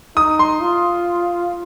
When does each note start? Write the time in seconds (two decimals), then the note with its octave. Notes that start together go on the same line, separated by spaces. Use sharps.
0.17 D#4 D#6
0.39 C6
0.61 F4